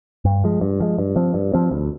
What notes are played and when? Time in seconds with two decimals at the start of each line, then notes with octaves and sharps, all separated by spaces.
0.25 G2
0.44 F3 G#3
0.61 G2
0.80 F3 G#3
0.98 G2
1.16 F3 C4
1.34 G2
1.53 F3 C4
1.71 D2